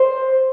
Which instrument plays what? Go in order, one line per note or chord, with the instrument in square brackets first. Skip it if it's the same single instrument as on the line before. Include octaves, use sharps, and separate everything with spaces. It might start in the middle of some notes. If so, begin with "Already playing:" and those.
Already playing: [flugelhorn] C5